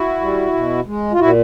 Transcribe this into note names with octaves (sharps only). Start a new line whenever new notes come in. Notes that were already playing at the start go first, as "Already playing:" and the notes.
Already playing: E4 F#4
G3
B2
G#3
F4
A#2 E4 F#4